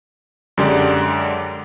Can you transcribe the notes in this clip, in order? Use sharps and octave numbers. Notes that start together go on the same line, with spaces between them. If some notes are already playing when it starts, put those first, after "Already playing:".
F#2 D3 G#3 G4 D5